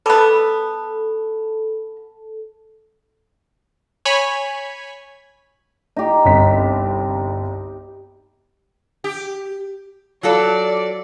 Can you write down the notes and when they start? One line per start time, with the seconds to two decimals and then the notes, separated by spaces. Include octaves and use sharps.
0.06 G3 B3 A4
4.05 C#5 G#5 B5 B6
5.96 D#4 G4
6.25 G1 C2 B6
9.04 G4
10.23 F#3 F4 A4 D5